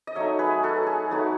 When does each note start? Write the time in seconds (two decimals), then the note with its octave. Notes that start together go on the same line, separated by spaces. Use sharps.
0.07 D#5
0.15 F#3 A3 D#4 C#5 E5
0.39 G#4 B4
0.63 F#4 A4
0.87 G#4
1.10 F#3 A3 D#4 F#4